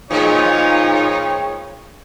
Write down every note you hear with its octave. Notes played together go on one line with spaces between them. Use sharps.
A2 D#3 F3 G#3 B3 D#4 C#5